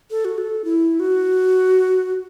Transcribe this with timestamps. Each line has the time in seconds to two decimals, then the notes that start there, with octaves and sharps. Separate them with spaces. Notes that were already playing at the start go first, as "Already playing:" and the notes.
0.11 A4
0.25 F#4
0.38 A4
0.65 E4
1.00 F#4